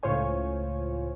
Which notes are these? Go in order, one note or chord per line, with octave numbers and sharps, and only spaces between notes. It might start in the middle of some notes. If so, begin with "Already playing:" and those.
C#2 A2 F4 C5 C#5 G#5